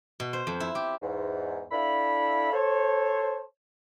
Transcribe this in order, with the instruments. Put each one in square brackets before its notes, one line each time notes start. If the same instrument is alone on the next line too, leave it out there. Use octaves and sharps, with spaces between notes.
[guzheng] B2
C5
F2
E4
G4
[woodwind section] E2 G#2
D4 E4 A4 E5 F5 B5
A4 C5 C#5